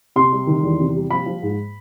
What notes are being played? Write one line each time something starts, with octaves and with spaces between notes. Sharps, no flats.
C3 C6
G3
D#3
E2
C3
G3
F3 B5
F3
G#2